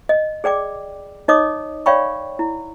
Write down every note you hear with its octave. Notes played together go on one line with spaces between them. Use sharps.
D#5
G#4 D5 G5 D6
D#4 C#5 D#5 D6 D#6
C#5 D5 F5 G5 B5 C#6
E4